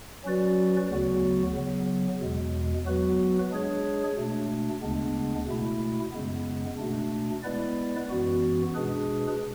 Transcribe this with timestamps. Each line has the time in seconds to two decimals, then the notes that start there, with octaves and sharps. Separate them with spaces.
0.24 F#3 C#4 F#4 B4 D5
0.89 D2 C#3 F#3 B3 F#4
1.55 C#3 F#3 B3
2.21 E2 B2 G#3
2.86 F#3 B3 F#4 B4
3.51 G#3 D4 G#4 C#5
4.17 B2 A3 D4
4.82 D2 C#3 G#3 B3 D4
5.48 B2 A3 E4
6.12 F#2 C#3 G#3 B3
6.78 B2 A3 D4
7.43 G#3 B3 E4 B4 D5
8.10 F#2 E3 B3 F#4
8.75 B2 G#3 D4 G#4 B4